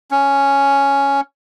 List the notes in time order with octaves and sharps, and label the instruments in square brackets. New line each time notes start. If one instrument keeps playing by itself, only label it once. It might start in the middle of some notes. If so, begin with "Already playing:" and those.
[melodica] C#4